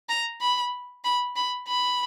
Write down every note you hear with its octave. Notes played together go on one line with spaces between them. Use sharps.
A#5
B5
B5
B5
B5